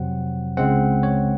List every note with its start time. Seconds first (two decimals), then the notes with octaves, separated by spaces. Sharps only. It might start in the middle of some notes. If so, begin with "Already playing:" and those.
Already playing: F2 C3 F#3 C4 F#5
0.57 C#2 C#3 G#3 C4 F#5
1.03 C#5